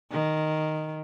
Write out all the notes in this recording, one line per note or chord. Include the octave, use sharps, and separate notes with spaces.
D#3